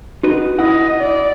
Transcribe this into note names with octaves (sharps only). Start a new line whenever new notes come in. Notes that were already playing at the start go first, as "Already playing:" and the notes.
D#4 F#4 B4
E4 D#5 F#5
D5